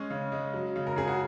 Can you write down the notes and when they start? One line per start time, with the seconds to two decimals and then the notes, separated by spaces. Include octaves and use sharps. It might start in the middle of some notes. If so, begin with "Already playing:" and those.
Already playing: G#3 C#4
0.10 C#3
0.32 G#3
0.54 F#3
0.76 C#3
0.87 A#4
0.96 C#3 G#4
1.08 F#4